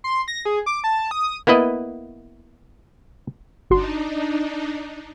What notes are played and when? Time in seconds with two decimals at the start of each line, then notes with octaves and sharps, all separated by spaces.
0.04 C6
0.28 A#6
0.45 G#4
0.66 D6
0.84 A5
1.11 D#6
1.47 A#3 B3 E4 B4 D#5
3.70 G1 D4 D#4 F#4 C6